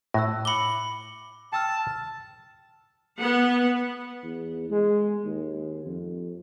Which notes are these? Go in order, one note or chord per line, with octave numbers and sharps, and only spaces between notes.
A2 E6 F#6 A#6
B5 D6 C#7 G7
G5 A5 E6 F6
B3 F#5
E2
G#3
D#2
F2